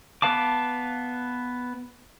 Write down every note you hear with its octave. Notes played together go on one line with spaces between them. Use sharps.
B3 B4 F5 A5 D6